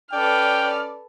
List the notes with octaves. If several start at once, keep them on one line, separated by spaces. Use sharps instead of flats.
C#4 A4 B4 D5 G5 F6